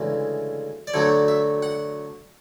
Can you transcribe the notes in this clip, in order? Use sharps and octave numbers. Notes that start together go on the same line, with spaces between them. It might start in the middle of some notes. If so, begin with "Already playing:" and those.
Already playing: D2 C#3 E3 G#3
D5
D2 D3 F#3 A3 C#5
E5
F#5